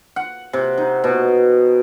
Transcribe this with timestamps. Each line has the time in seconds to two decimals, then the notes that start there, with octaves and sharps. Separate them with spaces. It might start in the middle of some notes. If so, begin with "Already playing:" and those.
0.16 F#5
0.53 C3
0.78 D#4
1.04 B2